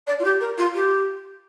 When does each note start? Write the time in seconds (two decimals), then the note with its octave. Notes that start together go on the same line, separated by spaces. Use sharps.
0.07 D5
0.19 F4
0.24 G4
0.40 A#4
0.57 F4
0.74 G4